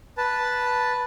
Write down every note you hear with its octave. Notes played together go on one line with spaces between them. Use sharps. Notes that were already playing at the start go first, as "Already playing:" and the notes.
B4 A5